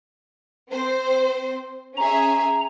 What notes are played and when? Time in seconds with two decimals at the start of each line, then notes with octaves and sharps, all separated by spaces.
0.70 C4 C5
1.97 C#4 G#4 E5 A#5